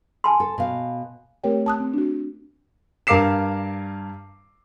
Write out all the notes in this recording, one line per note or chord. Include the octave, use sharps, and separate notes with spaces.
G#5 A5 C6
A4
B2 F5
A3 C4 G4 A#4 C#5 G5
A5 D#6 F#6
C4
D4 F#4
G2 A#4 F5 D6 C7 E7